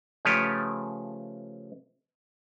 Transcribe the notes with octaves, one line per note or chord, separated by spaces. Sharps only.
C#3 F3 A3 G4 B4 C#5